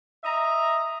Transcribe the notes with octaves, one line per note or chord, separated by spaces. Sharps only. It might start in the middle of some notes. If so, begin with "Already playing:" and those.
D#5 E5 A#5